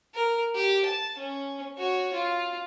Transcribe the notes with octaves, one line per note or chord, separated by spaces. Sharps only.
A#4
G4
A5
C#4
F#4 C#5
F4